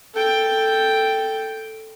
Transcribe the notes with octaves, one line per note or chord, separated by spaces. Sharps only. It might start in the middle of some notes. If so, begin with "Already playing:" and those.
A4 G5